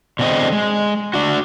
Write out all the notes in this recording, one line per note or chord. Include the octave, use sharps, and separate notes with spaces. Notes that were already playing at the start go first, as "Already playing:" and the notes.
B2 D3 C4 E4 D#5
G#3
D4 F#4